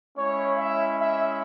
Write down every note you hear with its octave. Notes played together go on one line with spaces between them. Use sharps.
G#3 C#4 E4 C#5
E5
E5